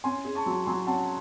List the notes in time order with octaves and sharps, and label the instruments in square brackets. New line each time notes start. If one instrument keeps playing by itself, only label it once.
[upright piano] C#4 [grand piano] G#5 C6
[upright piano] G#4
[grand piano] A5 C#6
[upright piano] F#3
[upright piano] F#3 [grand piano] G#5 C6
[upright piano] C#4 [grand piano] F#5 A5